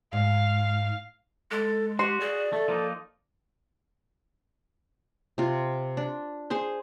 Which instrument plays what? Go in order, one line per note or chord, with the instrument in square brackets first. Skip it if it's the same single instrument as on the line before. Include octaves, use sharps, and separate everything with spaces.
[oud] G#2 [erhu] F5
[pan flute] G#3 [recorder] A4
[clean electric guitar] F#4 [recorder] G4 [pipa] C6
[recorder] G#4 [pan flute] D5
[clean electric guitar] A3 [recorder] A4
[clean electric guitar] F3 A#3 D#4
[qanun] C3 F4
D4
G#4 C5 C6